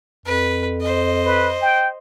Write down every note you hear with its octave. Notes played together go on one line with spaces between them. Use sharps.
F2 B4
C5 D#5
B4
G5